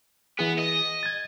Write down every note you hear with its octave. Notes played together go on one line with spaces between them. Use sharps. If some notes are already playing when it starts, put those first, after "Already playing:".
E3 B3 G#4
D#5
G#6 A6